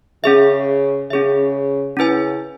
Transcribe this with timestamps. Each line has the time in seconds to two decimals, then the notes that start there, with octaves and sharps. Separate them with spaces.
0.24 C#3 C#4 G#4 E5
1.10 C#3 C#4 G#4 E5
1.97 C#3 C#4 E4 B4 G#5